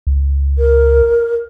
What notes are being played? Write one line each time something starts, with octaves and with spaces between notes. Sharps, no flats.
C#2
A#4